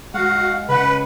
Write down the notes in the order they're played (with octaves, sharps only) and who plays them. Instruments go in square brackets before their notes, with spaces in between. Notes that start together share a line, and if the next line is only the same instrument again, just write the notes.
[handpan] G#3 [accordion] F#4 [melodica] F5 F#5
[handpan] C#3 F#5 [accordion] B4 [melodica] B5